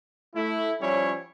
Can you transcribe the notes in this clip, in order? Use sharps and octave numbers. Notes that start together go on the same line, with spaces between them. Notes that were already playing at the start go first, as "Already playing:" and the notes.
A3 E4
F3 G3 C#4 E4 C#5